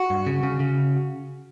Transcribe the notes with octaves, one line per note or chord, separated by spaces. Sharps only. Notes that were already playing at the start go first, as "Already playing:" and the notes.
Already playing: F#4
G2
C#3
C#3
C#3